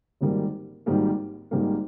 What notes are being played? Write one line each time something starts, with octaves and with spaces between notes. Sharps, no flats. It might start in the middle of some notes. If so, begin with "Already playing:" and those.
G#1 G#2 D#3 G3 A#3
G#1 G#2 D#3 G3 A#3
G#1 G#2 D#3 G3 A#3